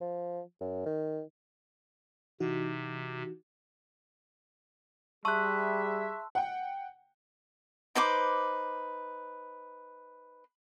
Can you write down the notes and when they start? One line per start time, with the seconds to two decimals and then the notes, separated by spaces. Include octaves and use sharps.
0.01 F3
0.61 F#2
0.86 D#3
2.40 C3 E3 D#4 F#4
5.25 G3 G#4 E5 A5 C6 C#6 E6 F#6
6.35 F#5 G5
7.95 D#4 B4 C5 D6